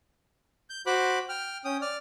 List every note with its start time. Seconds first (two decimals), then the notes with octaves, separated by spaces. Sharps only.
0.70 G6
0.86 F#4 C5 B5 D6 F#6
1.29 G5 F6
1.65 C#4 G5 D#6
1.82 D5 F6